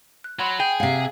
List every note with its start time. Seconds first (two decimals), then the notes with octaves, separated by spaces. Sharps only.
0.24 F#6
0.39 F#3 F#5 B5 C6
0.60 G#4 G5
0.80 C3 F5 F#5 G#5 C7